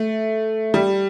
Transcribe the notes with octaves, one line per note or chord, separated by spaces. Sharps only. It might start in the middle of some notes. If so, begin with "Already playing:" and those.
Already playing: A3
G3